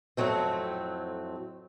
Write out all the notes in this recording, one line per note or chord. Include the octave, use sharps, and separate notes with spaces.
F2 A2 F#3 A3 C4